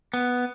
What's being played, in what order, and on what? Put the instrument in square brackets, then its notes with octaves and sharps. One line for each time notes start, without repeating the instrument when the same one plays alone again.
[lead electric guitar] B3